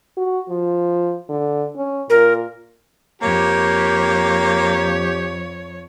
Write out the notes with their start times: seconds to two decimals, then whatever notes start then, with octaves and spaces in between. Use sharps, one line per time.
0.17 F#4
0.49 F3
1.29 D3
1.76 C#4
2.10 A#2 A#4
3.22 F2 A#3 G4 C#5